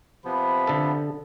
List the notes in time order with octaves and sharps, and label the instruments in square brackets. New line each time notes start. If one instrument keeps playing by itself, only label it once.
[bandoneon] C3 F3 B3 [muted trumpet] B5
[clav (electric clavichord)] D3 A4